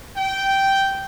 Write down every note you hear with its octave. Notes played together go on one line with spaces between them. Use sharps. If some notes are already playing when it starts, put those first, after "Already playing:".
G5